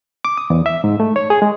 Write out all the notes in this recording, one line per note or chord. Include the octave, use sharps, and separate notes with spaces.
D6
D#6
E2
E5
G#2
A3
C#5
G#4
G#3